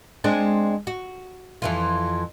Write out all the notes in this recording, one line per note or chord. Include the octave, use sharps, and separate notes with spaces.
G#3 C4 D4
F#4
F2 E3 F4